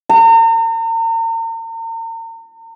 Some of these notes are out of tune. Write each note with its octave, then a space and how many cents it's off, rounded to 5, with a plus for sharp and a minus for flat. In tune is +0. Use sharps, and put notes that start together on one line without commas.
A#5 -40